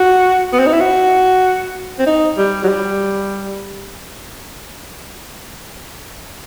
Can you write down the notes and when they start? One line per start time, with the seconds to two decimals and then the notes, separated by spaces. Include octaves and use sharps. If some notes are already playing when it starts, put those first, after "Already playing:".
Already playing: F#4
0.53 B3
0.59 C4
0.66 D#4
0.73 E4
0.80 F#4
1.99 C4
2.06 D#4
2.38 G3
2.64 F#3
2.69 G3